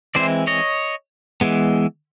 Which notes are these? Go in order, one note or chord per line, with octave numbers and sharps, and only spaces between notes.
E3 G#3 C4 E4 C5 D5
C#5 D#5
E3 G#3 B3